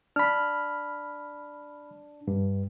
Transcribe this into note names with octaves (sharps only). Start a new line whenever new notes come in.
D4 B5 F6
G2